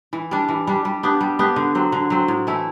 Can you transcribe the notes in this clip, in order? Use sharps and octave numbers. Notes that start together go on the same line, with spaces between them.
E3
G3 D4
E3
G3 D4
G3
B3 D4 G4
G3
B3 D4 G4
D3
F#3 C4
D3
F#3 C4
A2
E3 A3 E4